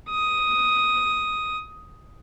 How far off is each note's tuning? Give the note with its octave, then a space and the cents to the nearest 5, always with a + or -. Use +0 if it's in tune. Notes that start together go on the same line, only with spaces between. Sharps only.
D#6 +5